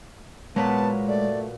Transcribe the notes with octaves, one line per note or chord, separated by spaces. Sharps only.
A#2 F#3 G#3 B3 B4 C#5 A5
A3 D5